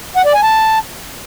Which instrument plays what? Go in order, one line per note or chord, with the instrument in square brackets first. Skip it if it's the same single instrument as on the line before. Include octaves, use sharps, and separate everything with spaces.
[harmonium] F#5
D5
G#5
A5